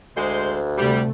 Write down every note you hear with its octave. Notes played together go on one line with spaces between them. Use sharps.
D2 G#3 C5
C3 G3 A3